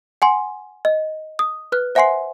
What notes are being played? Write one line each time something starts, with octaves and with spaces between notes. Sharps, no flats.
F#5 G#5 C6
D#5
D#6
B4 F6 F#6
C5 E5 F#5 G#5 C6 C7